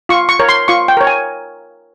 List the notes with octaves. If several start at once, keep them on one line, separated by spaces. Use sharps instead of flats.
F4 C#6
C#6
A#4 C#5
C6
F4 C#6
G5
A#4 C#5
G#5